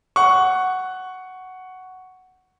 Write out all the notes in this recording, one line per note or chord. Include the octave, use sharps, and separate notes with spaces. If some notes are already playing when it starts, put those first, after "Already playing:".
F#5 C#6